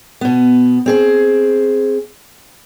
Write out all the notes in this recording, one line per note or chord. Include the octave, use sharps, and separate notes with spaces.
B2 B3
C4 G#4 C5